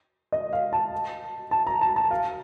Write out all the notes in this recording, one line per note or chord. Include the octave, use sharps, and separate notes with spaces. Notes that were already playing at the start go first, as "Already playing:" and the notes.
D#5
F5
A5
A5
A#5
A5
A5
F5